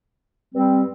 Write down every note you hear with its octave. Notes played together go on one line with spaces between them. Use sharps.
G2 G3 C4